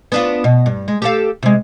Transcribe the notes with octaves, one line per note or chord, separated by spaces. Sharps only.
B3 D4 F4
B2
G2
G#3
G4 A4 F5
C3 G#3